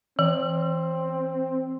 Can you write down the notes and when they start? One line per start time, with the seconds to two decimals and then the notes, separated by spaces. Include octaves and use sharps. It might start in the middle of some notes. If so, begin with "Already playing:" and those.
0.19 E3 C4